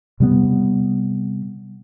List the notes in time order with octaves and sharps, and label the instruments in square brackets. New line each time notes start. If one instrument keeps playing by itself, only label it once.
[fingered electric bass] C3 G3 A#3 B3